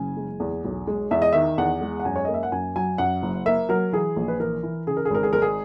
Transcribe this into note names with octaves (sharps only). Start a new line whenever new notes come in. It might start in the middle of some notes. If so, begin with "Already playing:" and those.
Already playing: F#1 C#3 G#5
G#3
E2
B1
G#3
E2 E5
D#5
D#3 E5
E2 F#5
G#3
F#5
F#2 G#5
C#5
A#3 D#5
E5
F#5
F#2 G#5
F#3 G#5
F#2 F#5
F#1
A#3 E5
F#3 A#4
E3 G#4
A#1
B4
E3 A#4
E3
C#3 G#4
A#4
G#4
G#1 A#4
G#4
G#3 A#4
G#4